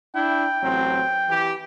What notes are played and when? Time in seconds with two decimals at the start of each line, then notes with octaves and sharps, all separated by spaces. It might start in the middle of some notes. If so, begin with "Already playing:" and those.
0.15 D4 E4 G5
0.63 A1 F#3 C4
1.29 E3 G4